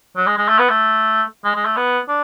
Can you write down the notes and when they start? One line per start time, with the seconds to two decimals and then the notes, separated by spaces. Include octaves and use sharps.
0.16 F#3
0.27 G#3
0.38 G#3
0.49 A3
0.59 B3
0.70 A3
1.44 G#3
1.55 G#3
1.66 A3
1.77 B3
2.08 D4